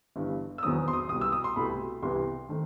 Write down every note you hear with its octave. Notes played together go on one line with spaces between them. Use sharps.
G1 G2 E3
E6
E1 E2 D#3 F#3 C4 D#6
C6
D#6
C2 B2 G3 D#6
E6
D#6
C6
C2 B2 A3 E4 B5
C2 C3 E3 B3 E4 C6
D#3 A3 C4